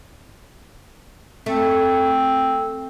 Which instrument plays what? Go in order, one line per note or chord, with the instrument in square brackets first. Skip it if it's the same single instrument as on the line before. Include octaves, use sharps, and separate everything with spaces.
[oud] A3 [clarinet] C4